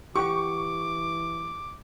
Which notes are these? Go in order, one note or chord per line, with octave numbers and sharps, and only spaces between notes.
E3 G4 F#5 G5 C#6 D6